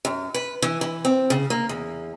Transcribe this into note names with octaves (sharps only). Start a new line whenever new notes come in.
F#2
B4
E3
E3
C4
C#3
A#3
E2